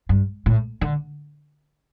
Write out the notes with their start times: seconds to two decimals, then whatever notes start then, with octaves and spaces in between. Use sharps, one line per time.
0.09 G2
0.46 A2
0.81 D3